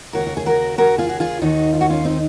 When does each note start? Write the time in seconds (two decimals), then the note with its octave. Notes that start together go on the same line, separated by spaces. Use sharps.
0.13 D#2 C#3 F#4 A#4
0.27 F#4
0.37 G#4
0.46 F#4 A#4
0.78 F#4 A#4
0.98 F4 G#4
1.09 F#4
1.20 F4 G#4
1.41 D#2 D#3 D#4 F#4
1.73 F4
1.81 F#4
1.90 C#4 F4
2.05 C4 D#4